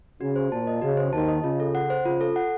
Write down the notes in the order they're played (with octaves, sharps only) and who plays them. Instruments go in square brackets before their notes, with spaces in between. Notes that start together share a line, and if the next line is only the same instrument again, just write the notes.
[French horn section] C#3 [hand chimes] F#4
[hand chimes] C5
[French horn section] A#2 [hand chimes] A5
[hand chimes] D#5
[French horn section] C#3 [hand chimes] F#4
[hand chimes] C5
[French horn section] D#2 D#3 [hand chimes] A5
[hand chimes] D#5
[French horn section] C#3 [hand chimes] F4
[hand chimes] A4
F#5
C5
[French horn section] C#3 [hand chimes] F4
[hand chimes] A4
F#5